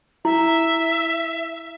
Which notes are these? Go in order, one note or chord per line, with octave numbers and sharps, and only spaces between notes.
E4 E5